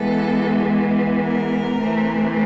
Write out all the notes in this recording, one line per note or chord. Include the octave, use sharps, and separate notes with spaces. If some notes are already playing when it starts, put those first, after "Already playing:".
Already playing: E3 G#3 B3 A4
A#4
C3 E3 A3